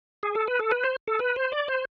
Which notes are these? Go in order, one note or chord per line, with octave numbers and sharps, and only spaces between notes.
G#4
A4
B4
A4
B4
C5
A4
B4
C5
D5
C5